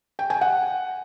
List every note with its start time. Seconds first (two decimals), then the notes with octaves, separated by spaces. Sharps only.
0.19 G5
0.30 G#5
0.41 F#5